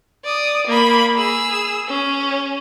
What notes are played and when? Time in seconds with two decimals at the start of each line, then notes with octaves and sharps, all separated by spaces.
0.24 D5 D#6
0.67 A#3 B5
1.16 G#4 E6
1.88 C#4